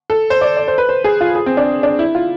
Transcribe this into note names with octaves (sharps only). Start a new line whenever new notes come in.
A4
C5
D5
D5
C5
B4
C5
G#4
F4
G#4
C4
D4
D4
E4
F4